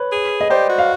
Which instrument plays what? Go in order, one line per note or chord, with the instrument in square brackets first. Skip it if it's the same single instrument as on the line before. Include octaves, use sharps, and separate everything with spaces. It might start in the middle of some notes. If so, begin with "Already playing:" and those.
Already playing: [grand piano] B4 C#5
[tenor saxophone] G#4
[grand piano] D#5
[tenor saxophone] G4 [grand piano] C5 D5
[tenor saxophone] F#4
[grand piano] F5